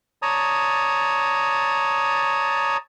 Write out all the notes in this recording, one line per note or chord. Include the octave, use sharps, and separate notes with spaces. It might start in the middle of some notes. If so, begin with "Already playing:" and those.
C#5 D5 A5 A#5 D#6